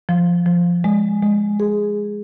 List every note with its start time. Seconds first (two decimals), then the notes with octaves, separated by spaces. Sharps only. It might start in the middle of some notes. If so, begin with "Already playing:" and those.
0.09 F3
0.46 F3
0.84 G#3
1.22 G#3
1.60 G#4